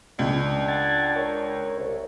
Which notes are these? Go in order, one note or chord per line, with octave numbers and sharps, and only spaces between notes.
C#2 D4
F#5 G#6 A6
A#4 C#5
C2